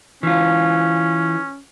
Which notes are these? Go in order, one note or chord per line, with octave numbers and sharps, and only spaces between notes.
E3 C#4 F4